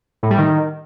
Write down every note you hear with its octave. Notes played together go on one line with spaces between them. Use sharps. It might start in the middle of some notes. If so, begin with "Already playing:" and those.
A2
G3
D#3